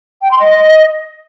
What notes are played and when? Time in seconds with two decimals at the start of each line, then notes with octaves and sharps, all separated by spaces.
0.22 G5
0.31 C6
0.40 D#5